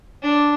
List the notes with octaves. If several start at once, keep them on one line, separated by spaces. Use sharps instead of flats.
D4